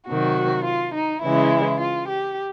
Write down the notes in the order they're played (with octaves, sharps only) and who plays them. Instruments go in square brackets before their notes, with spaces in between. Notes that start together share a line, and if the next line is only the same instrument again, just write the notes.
[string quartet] C3 D#3 F#3 F#4
F4
D#4
C#3 E3 G#3 E4
F4
G4